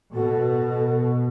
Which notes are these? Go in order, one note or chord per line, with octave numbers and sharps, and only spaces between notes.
B2 F#4 A4